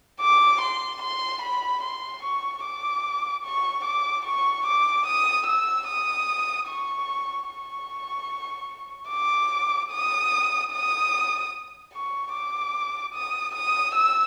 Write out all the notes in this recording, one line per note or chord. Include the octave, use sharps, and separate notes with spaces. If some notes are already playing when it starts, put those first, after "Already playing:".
D6
C6
C6
B5
C6
C#6
D6
C#6
D6
C#6
D6
D#6
E6
D#6
C#6
C#6
D6
D#6
D#6
C#6
D6
D#6
D#6
E6